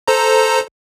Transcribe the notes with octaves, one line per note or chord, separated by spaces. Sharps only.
A4 C5 A#5